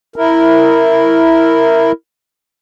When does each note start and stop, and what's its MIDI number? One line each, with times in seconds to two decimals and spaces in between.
0.16 1.92 64
0.16 1.92 70